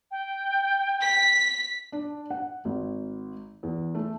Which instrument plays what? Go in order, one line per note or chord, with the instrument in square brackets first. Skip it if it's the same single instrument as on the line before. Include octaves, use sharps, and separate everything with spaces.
[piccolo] G5
[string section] B6
[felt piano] D4
F#5
G#1
E2
A3